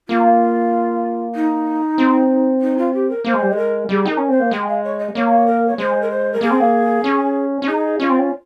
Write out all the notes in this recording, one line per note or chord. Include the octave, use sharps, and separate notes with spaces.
A#3 F4
D#4
C4
D#4
F4
G4
A#4
A#3 C5
G#3
G3
G#3 G#4
A#4
G3 G#4
D#4 A#4
C#4
C4 C5
A#3
G#3 G5
F5
C#5
D#5
A#3 C#5
A#4
C#5
G#3 C5
A#4
C5
A#4
A#3 G#4
C4
A#3
C#4
C#4
D#4 G#4
C#4 F4
C4
C#4